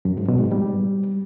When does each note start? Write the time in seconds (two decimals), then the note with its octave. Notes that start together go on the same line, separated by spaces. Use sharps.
0.05 F#2
0.17 G#2
0.28 B2
0.40 G#2
0.52 G3